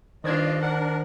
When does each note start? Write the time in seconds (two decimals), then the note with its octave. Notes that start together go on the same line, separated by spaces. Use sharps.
0.24 G2 D#3 D4 F4 C5 D5 D#5 G#6
0.61 D4 A#4 F#5